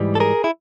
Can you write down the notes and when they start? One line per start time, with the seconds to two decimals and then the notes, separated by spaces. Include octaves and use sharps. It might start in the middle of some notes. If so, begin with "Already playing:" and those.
Already playing: G#2 E3 G3
0.15 A4
0.20 G#4 A#4
0.44 E4